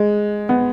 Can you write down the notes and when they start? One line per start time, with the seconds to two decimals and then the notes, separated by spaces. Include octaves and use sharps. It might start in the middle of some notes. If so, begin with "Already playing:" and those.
Already playing: G#3
0.49 B3